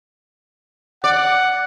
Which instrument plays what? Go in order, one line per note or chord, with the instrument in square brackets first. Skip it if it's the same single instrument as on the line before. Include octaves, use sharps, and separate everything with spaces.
[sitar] D5 [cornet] F#5